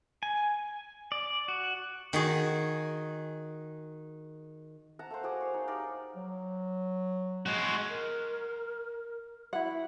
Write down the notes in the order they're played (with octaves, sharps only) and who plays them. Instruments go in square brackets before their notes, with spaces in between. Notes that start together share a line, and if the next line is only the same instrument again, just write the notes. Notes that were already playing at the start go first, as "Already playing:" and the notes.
[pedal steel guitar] G#5
D5
F#4
[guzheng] D#3 F#4 G#4
[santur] F#5 A5 A#5
A3 A#3 C5
F#4 G#4 D5
C#5 F5
D#4
D#4 G4 A#4 D5
[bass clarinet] F#3
[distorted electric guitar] G#3 F#4
[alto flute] A#4
[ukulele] E4 F#5 [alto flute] F#4